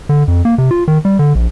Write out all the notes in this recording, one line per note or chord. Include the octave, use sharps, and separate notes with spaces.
D3
F2
A#3
C3
F4
D#3
G3
D3
A#1